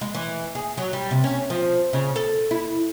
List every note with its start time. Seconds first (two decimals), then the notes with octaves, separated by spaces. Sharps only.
0.01 G#3
0.15 E3
0.55 G#4
0.78 F#3
0.93 G3
1.11 C3
1.24 C#4
1.50 F3
1.93 C#3
2.16 A4
2.51 E4